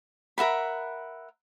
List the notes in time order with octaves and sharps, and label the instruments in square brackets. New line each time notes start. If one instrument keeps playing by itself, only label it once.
[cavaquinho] A#4 E5 F#5 B5